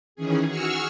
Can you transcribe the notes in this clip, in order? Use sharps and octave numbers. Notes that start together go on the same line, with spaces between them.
D#3 E3 C#4 G#4
F#4 G#4 C#6 E6 F6